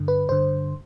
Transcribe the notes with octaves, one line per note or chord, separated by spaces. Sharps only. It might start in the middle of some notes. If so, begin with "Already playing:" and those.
Already playing: G2 D3
B4
G2 D3 C5